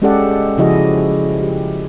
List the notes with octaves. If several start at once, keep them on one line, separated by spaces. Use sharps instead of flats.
G#3 C#4 G4 A4 D5 F#5
C#3 F3 E4 F#4 G#4 D#5
G4